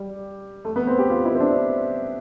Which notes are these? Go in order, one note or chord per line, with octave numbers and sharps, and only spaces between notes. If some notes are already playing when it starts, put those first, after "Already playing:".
Already playing: G3
A3
B3
C4
G4
F4
E4
C4
D4